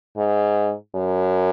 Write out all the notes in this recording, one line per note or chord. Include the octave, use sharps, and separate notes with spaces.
G#2
F#2